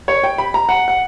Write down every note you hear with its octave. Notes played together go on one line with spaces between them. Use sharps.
C#5
G5
B5
A#5
F#5
F#5